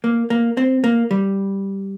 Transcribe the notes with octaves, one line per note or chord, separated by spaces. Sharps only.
A#3
A#3
C4
A#3
G3